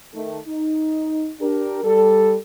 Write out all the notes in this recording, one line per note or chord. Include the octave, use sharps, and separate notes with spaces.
D#3 A3
D#4
D4 G4 A#4
G3 A4